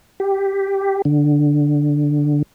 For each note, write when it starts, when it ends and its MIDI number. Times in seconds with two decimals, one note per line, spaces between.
0.20 1.02 67
1.05 2.42 50